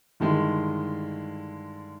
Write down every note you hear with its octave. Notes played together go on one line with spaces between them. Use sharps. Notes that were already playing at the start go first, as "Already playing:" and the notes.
G2 D3 D#3 G#3 E4